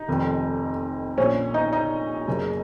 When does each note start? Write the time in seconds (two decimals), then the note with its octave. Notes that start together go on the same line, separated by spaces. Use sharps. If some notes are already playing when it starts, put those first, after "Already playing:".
Already playing: D#4 D#5
0.08 F1 F2 D#3
1.18 A#1 A#2 C#4 C#5
1.54 D#4 D#5
1.73 D#4 D#5
2.27 F#1 F#2 C#3